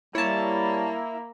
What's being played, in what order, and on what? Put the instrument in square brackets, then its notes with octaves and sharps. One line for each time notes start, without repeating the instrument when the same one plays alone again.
[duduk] G3 [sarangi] A#3 [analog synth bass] E4 [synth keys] C#5 A5